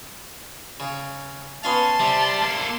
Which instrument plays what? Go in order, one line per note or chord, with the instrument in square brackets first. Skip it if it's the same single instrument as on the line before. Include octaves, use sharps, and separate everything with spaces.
[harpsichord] C#3
[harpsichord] B3 C#4 F5 [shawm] A5 [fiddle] C6
[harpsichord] C3 [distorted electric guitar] G3
[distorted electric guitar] A#3 A4